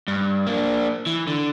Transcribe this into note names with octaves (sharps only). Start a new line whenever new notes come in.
G2
A#3 D4
E3
D3